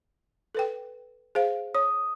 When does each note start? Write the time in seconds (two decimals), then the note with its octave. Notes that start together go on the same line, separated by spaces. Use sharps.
0.55 A4 B4 G5
1.35 G#4 C5 F5
1.75 C#5 D#6